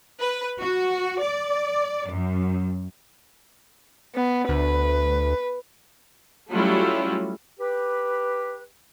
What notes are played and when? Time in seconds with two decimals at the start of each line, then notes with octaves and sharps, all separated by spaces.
0.21 B4
0.61 F#4
1.23 D5
2.10 F#2
4.15 B3
4.49 D2 B4
6.51 F#3 G3 A3 C#4 E4 F4
7.60 G4 B4